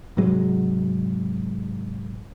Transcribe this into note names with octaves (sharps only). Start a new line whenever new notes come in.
G#2 C3 F#3 G#3